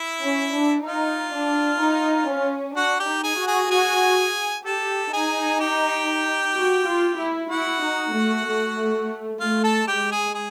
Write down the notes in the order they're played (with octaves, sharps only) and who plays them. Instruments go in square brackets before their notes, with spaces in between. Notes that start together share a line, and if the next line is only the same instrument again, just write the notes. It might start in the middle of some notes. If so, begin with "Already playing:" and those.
Already playing: [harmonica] E4 E5
[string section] C#4
D4
[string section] D#4 [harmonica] F4 F5
[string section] D4
D#4
C#4
[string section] D4 [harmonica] F#4 F#5
[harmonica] G4 G5
[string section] D#4
[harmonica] G#4 G#5
[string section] F#4
[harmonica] G#4 G#5
[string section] F#4 [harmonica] G#4 G#5
[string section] G4 [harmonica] A4 A5
[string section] D#4 [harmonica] G#4 G#5
[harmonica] G4 G5
[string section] F#4
F4
E4
[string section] E4 [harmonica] F#4 F#5
[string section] D#4
A3
A3
[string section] A3 [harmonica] F4 F5
[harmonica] A4 A5
[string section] G#3 [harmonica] G4 G5
[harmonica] G#4 G#5
G#4